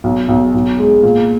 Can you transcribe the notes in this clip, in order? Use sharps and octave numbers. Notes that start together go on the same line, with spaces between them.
B1
B1
B1
G#3
A#2